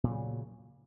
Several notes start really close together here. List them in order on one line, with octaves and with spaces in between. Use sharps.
A#2 F#3 C#3